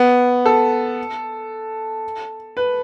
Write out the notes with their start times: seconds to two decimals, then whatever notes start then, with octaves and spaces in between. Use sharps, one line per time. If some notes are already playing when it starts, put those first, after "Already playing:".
Already playing: B3
0.46 A4
2.57 B4